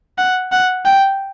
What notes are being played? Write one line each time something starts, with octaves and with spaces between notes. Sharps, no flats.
F#5
F#5
G5